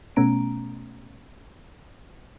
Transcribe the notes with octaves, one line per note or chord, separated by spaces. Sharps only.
B2 A3 B3 C#4 A#5 D7